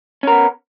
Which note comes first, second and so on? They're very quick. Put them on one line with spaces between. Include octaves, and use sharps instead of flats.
C#4 A#4 B3